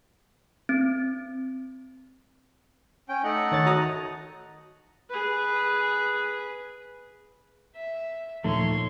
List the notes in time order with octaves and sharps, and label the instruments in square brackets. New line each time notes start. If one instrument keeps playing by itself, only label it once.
[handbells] C4
[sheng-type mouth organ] C#4 G5
A3 D#4 F#5
[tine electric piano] D#3 C#5 A6
F#4 A#5 D#6
[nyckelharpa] G#4 B4
[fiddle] E5
[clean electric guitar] D#2 D#3 A3 [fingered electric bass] A#2 F3 A#3 [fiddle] C#5 C6